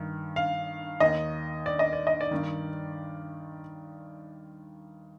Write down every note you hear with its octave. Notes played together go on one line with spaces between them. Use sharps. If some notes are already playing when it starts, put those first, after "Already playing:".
Already playing: G2 D#3
F5
D#2 D#3 D#5
D5
D#5
D5
D#5
D5
G2 D#3